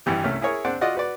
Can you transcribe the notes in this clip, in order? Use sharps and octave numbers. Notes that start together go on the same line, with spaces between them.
G#1 G2 E3 G4
C2 A3 C#4 F6
E4 G#4 A#4 C#5
C4 D4 D5 F#5
F4 F#4 D5 D#5 F#5
F#4 B4 D5